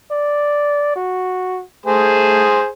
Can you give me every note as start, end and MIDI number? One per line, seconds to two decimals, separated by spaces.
0.11 0.92 74
0.96 1.63 66
1.86 2.47 57
1.86 2.68 68
1.86 2.68 72